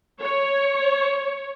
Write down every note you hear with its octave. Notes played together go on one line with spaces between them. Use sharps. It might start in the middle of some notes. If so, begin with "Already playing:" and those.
C#5